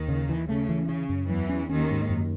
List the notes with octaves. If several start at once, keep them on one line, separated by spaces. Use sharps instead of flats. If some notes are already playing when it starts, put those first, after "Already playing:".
Already playing: D#2 D#3
C#3
E3
C#3 A3
E3
C#3 C#4
F#2
E2 E3 F#3
C#4
D#2 D#3 C#4
G#2
F#2